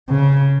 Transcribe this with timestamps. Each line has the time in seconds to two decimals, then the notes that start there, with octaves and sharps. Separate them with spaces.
0.09 C#3